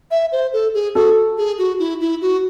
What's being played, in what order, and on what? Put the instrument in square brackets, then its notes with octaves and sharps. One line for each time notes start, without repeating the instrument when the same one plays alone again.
[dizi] E5
C5
A4
G#4
[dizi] F#4 [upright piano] A4
[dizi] G#4
F#4
E4
E4
F#4